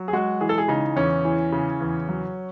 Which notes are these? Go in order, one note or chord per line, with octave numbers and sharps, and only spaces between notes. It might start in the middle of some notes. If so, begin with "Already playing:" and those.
Already playing: F#3
G#4
G#3 F#4
E3 G#4
A4
G#4
C#3 D#4
E2 C#4
E3
C#3
E2
F#3